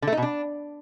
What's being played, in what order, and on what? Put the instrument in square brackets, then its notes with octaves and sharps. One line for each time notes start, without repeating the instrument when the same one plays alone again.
[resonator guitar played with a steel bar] D3
A3
D#4
B2
D4